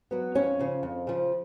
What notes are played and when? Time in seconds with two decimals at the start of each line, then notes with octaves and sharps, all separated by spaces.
0.11 F#3 B3
0.35 F2 C#4 C#5
0.59 C#3 F3
0.83 F2
1.07 C#3 F3